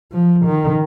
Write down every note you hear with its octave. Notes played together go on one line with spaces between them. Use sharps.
F3
D#3